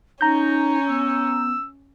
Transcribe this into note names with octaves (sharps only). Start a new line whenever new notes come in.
C#4 D#4 A#5 G6
B3 E6